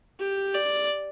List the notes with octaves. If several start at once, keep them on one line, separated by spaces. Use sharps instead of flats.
G4
D5